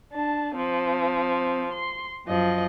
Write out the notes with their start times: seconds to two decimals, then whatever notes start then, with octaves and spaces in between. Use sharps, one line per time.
0.12 D4 A5
0.55 F3 C4
1.71 C6
2.27 F#2 F3 D#5